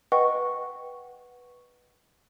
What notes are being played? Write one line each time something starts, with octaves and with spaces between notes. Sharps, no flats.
B4 D#5 F#5 G5 C#6